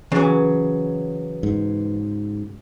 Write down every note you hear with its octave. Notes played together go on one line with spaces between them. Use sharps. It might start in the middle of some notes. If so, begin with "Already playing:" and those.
C#3 E3 F#3
G#2